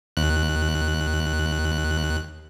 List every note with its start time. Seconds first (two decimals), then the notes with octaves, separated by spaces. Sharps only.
0.17 D#2 F#6